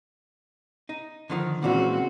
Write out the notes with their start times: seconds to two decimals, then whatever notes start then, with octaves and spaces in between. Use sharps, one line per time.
0.89 D#4
1.30 D3 D#3 F3
1.62 C#2 A#2 C#3 E3 C4 F#4